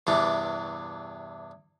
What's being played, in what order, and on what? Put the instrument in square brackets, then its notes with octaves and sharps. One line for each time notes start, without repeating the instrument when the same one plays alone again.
[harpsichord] E2 G2 C3 E3 D4